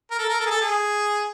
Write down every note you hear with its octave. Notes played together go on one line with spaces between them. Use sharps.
A#4
A4
A#4
A4
G#4
A4
G#4